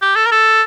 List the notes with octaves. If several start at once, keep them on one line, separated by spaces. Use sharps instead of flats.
G4
A4
A#4
A4